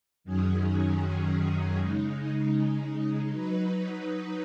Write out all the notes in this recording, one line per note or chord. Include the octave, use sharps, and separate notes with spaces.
F#2 D#3 F#3 C#4 G#4
C#3 G#3 D#4
F#3 D#4 B4